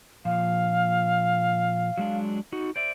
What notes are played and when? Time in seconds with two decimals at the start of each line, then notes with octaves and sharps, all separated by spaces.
0.25 A#2 F3 F5
1.98 F#3 G#3 D4
2.52 D#4 F#4
2.76 C5 D5 E5 D7